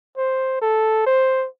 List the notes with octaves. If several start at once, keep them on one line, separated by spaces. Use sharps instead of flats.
C5
A4
C5